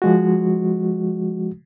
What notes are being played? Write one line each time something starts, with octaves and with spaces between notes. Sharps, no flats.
F3 G#3 F#4